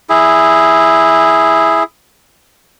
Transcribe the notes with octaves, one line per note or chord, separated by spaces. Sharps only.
E4 G#4